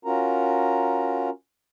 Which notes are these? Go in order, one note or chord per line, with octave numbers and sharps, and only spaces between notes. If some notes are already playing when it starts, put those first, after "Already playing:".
C#4 F4 F#4 A#4 A#5